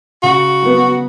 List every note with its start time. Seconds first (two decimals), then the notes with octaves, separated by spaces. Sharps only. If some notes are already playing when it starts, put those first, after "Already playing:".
0.23 C#3 F#4
0.62 F#3 B3